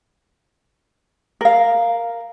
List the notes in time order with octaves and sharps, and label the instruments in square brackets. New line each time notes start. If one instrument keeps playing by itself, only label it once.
[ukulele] A#4 F5